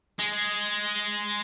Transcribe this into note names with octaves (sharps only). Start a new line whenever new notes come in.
G#3